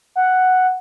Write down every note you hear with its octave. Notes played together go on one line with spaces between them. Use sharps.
F#5